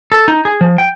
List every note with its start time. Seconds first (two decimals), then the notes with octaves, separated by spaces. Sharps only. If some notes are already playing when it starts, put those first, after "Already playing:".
0.12 A4
0.28 D#4
0.45 G#4
0.61 F3
0.78 G5